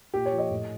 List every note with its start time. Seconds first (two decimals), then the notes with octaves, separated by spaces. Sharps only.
0.14 A#2 G4
0.25 C#5
0.32 F3
0.38 D#5
0.51 A2